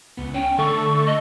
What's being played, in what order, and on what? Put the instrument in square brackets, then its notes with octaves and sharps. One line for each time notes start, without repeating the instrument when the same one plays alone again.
[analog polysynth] C#2 B3
[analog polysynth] C#4 [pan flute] G5
[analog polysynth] D3 A3 A4 [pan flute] C#6
[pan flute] D#5